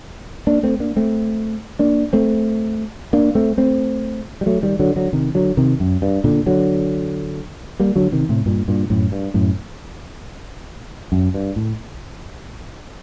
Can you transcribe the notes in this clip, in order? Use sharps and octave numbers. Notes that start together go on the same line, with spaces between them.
A#3 D4
A3 C4
A#3 D4
A3 C4
A#3 D4
A3 C4
A#3 D4
A3 C4
A3 C4
G3
F#3 A3
D#3 G3
D3 F#3
D3 F#3
C3 D#3
D3 F#3
C3 D#3
F#2
G2
A#2 D3
D3 F#3
G3 A#3
D3 F#3
C3 D#3
A2 C3
G2 A#2
G2 A#2
F#2 A2
G2
F#2 A2
F#2
G2
A2